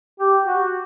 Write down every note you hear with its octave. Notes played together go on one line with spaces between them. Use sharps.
G4
F#4